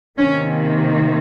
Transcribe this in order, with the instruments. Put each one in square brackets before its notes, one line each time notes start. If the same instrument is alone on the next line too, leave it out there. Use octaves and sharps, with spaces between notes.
[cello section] C3 D#3 A#3 C#4